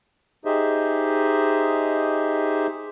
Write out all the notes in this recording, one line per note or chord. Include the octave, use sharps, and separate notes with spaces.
D#4 G4 G#4 C5 D#5 E5